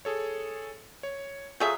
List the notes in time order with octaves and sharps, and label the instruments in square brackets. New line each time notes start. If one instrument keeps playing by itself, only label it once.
[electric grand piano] G#4 A4 C#5
C#5
[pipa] F#3 G#4 E5 [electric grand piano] F4 G6